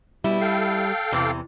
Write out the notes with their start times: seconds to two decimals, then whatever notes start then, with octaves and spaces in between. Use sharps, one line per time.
0.24 B2 G3 E4
0.40 A4 F5 G5
1.12 E2 C3 E3